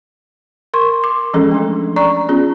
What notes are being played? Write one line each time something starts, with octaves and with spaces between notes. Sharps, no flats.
A#4 C6 C#6
D6
E3 F3 G#3 C#4 G#4 A4
A3 D4
D5 A#5 C#6
B3 C#4 F4 G#4